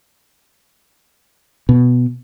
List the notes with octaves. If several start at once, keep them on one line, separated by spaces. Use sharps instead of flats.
B2